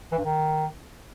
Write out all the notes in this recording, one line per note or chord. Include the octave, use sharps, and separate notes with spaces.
E3
G2
D#3